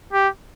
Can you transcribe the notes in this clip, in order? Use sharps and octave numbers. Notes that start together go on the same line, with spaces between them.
G4